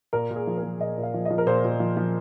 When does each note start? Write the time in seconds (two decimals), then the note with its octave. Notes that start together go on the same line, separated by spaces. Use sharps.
0.13 A#2 A#4
0.30 A#2
0.36 G#4
0.47 F3
0.57 A#4
0.63 F3
0.80 A#2 D#5
0.97 A#2
1.03 F5
1.14 F3
1.25 D#5
1.30 F3
1.38 A#4
1.46 A#2 C5
1.64 A#2
1.80 F3
1.97 F3